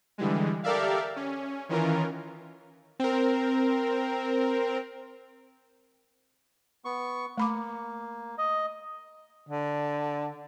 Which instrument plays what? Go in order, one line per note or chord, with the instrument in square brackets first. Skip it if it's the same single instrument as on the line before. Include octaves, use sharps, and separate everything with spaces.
[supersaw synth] D3 E3 G3 G#3
G4 A4 A#4 D5 E5 F5
C#4
D#3 E3 C#4 F4 A#4
[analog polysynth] C4 A#4
[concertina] B3 C#6
[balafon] A3 B5 D6 [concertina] A#3
[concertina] D#5
[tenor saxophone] D3